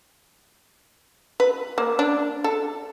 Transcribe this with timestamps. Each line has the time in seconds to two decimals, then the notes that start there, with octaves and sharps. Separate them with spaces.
1.40 B4
1.78 A#3
1.99 D4
2.44 A4